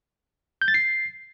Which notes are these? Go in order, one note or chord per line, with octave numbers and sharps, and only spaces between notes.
G6
A6
C7